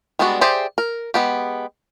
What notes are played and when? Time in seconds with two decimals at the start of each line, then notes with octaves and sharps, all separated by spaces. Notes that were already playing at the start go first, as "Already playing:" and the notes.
0.19 G3 G#3 B3 D4 F#4
0.41 G4 G#4 C5 D5 E5
0.78 A#4
1.14 G#3 B3 G4